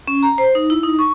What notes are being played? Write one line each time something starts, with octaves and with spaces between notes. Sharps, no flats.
C#4
A#5
C5
D#4
E4
D#4
C#6